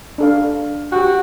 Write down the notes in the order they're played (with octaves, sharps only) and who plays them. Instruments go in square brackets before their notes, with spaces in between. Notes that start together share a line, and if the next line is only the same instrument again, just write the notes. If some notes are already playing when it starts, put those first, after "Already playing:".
[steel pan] D4 A4 F5
[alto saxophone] F#4 [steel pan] G4 G5